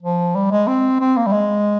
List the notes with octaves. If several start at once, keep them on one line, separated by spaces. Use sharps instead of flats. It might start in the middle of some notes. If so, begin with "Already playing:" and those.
F3
G3
G#3
C4
C4
A#3
G3
G#3